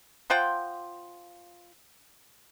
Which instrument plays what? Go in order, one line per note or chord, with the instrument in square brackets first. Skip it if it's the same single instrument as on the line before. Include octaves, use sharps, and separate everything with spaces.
[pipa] F3 F4 F#5 G5